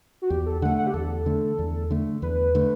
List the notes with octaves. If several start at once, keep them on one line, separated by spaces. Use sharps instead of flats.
F#4
E2 G4
A4
D3 A3 F#5
F#5
G4
E2 A4
D3 A3
E2
D3 A3
E2 B4
D3 A3